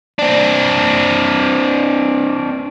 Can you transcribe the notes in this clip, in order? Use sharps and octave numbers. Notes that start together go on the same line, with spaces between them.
C4 D4